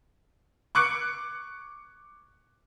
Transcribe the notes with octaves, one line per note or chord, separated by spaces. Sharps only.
C#6 D6 F#6 C#7 D7